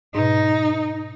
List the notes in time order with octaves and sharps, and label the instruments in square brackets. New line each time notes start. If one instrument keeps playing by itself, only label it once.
[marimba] G#2 B2 [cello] D#4